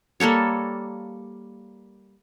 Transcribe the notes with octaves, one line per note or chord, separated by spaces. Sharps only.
G3 A#3 A4 C#5